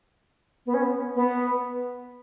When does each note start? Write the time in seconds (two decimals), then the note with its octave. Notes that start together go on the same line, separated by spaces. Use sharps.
0.66 B3
0.74 C#4
0.82 B3
1.15 B3